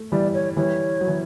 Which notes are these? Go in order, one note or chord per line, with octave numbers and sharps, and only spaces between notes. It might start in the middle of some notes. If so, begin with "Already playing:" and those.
Already playing: A3
E3 G3 D5
C#5
E3 G3 C#5
F#3
E3